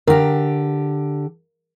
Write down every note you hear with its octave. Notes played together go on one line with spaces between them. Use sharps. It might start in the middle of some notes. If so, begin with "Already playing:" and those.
D3 G4 A#4